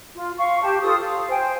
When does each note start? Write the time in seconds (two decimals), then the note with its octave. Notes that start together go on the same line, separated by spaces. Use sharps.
0.15 F4
0.38 F5 C#6
0.62 G4 A5
0.82 F4 A4 C5 D#6
1.00 F5
1.29 C5 G5 G#5